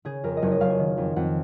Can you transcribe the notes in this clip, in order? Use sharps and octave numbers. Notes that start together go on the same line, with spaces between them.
C#3 G#4
F2 A#4
D#5
F#1 C#5
D#5
F#1 F5
G#5
D#3
F2
F2 F#5